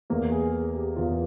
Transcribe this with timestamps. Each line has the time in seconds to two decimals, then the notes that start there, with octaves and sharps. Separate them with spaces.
0.10 E2 E3 A#3
0.32 G#4
0.53 G#4
0.74 G4
0.96 E2 E3 F4